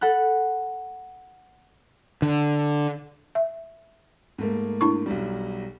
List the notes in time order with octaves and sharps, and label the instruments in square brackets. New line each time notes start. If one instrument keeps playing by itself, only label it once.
[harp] A4 F#5 B5 F#6
[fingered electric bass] D3
[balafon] E5
[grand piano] G#2 A3 A#3
[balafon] D4 E4 C#6
[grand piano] B1 F#3 G3